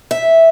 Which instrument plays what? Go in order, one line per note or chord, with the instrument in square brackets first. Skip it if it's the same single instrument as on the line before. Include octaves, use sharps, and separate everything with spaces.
[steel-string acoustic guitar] E5